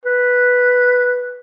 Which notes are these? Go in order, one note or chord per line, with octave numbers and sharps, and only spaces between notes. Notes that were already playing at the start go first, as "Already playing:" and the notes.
B4